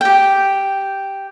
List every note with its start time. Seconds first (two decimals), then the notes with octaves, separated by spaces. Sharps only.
0.01 G4 G5